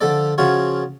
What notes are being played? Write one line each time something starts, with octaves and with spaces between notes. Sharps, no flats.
D3 F3 A4 D5
C#3 F3 F4 F#4 C#5